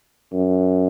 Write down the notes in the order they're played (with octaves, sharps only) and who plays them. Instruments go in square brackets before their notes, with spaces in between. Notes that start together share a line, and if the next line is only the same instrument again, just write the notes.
[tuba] F#2